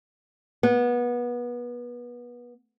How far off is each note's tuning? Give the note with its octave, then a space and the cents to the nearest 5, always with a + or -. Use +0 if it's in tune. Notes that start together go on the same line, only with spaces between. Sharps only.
B3 -25